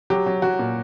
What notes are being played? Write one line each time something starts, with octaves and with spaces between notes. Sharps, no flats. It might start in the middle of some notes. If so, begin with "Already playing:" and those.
F#3 G4
F#3
F#3 F#4
A#2